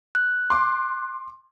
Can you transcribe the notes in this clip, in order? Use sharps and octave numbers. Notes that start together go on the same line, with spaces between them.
F#6
C6 D6